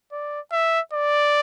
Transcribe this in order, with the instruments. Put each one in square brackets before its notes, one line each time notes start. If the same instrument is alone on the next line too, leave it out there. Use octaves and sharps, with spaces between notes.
[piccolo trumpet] D5
E5
D5